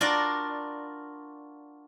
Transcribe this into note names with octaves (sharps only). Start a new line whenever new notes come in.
D4 F4 F#4 A#4 D5